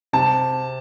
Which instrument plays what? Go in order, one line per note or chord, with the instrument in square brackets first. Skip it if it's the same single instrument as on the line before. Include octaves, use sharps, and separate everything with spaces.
[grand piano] C3 A5